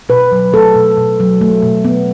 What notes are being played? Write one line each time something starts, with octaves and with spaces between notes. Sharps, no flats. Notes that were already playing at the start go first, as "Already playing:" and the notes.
B2 B4
F#3
A3 A4
B2
B2
F#3
A3
B2
B3